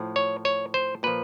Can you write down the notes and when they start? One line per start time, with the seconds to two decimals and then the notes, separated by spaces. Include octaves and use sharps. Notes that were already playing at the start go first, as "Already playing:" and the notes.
Already playing: A2 F3
0.16 C#5
0.45 C#5
0.74 C5
1.03 A#2 F3 B4